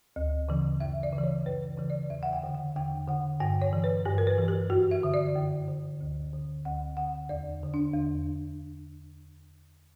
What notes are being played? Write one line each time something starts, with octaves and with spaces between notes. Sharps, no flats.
D2
C#3 E3
F#2 E5
D5
C#3
E3
C#5
F#2 B4
C#3 E3
D5
E2 E5
F#5
G5
D3
F#5
E2 G5
D3 F#5
G2 G5
C#5
E3
B4
G2 G4
A#4
B4
E3
G4
F#2 F#4
E5
D3
D5
F#2
D3
D2
D3
D2 F#5
D3 F#5
E2 D5
D3
D4
E2